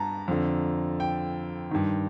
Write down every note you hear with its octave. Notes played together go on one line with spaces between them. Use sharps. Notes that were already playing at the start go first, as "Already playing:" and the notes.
Already playing: G2 A5 A#5
F2 D3
G5
G2 D#3